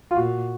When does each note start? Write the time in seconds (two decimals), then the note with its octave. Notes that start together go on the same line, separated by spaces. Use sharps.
0.11 F4
0.15 A#2 F#4